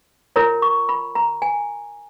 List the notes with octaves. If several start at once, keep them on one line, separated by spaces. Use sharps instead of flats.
F4 A#4 C#5 A#5
C#6
B5
A#5
G#5